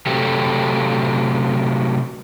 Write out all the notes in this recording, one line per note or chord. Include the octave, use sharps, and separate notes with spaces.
C3 F#3 A3 G4 A4